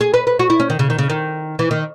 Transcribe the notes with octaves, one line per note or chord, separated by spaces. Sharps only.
G#4
B4
B4
F#4
E4
C#4
D#3
C#3
D#3
C#3
D#3
E3
D#3